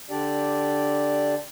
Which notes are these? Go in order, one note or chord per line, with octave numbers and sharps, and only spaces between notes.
D3 D4 G4 D5